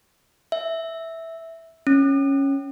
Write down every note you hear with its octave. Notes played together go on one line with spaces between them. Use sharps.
E5
C#4